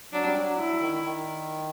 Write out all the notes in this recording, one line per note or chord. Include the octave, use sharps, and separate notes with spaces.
F#3 D4
G3
F#3
E4
D#3
D#3